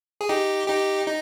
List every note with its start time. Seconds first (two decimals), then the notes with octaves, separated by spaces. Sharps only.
0.21 G#4
0.29 D#4 G4
0.67 D#4 G4
1.06 D#4